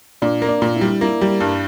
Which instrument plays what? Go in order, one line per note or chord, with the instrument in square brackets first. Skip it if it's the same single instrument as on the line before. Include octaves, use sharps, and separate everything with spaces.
[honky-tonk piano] A#2 [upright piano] D4
[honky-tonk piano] A#3
[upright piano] D4
[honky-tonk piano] A#2
[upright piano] E4
[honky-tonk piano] G3
[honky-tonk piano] A#3 [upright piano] E4
[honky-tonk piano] G3
G2